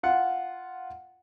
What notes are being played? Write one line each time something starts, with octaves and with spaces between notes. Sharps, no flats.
F4 F#5